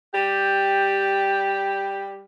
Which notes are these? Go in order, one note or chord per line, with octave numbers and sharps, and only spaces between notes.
G3 G4